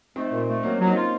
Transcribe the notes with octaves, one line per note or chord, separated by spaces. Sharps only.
A3 C4 D#4
A#2
A3
F#3 A#3 C#4
F#3
C4 D#4
F4